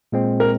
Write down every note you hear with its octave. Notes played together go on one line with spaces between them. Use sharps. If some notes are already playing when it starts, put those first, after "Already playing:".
A#2 G#3 C4
A#4